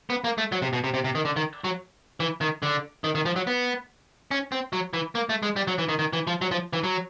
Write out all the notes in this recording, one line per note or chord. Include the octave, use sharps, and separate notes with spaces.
B3
A#3
A3
F#3
C3
B2
C3
C3
C3
D#3
D3
D#3
F#3
E3
D#3
D3
D#3
D#3
F3
F#3
B3
C#4
C4
F#3
E3
A#3
A3
G#3
G3
F#3
E3
D#3
D#3
E3
F3
F#3
F3
E3
F#3